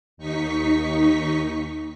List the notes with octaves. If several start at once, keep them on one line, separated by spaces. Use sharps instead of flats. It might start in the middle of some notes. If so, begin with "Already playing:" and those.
D#2 D#4 C#6 B6